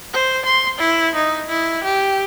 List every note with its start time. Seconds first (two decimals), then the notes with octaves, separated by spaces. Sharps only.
0.14 C5
0.46 C6
0.79 E4
1.16 D#4
1.49 E4
1.84 G4